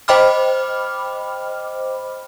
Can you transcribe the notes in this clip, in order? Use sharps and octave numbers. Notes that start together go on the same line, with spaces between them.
C5 D#5 G5 B5 D6 F6